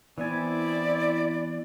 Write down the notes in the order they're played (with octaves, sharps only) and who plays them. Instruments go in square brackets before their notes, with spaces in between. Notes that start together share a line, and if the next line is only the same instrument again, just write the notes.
[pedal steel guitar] E3 B3 G#5 [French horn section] C4 E4 [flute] D5